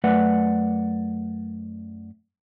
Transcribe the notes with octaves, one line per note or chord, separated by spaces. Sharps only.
F#2 A3 B4 D5 F#5